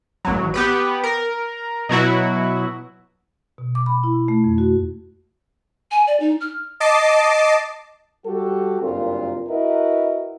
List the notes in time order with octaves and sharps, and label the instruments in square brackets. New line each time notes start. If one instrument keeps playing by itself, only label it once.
[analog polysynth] A1 F#3
B3 G4 B4
A#4
B2 F#3 E4 F#4
[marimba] B2
D6
B5
E4
A3
F2
F#4
[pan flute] G#5
D5
D#4
F6
[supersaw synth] D#5 A5 D6 C7
[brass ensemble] G3 F#4 G4 A4
F#1 G2 A#2 C4 F4 A#4
E4 F#4 A#4 B4 D#5 E5